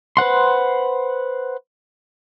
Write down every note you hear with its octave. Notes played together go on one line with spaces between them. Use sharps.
B4 C5 F#5 C6